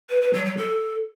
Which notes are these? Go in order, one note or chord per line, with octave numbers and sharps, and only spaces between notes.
B4
B4
F#3
F#3
A4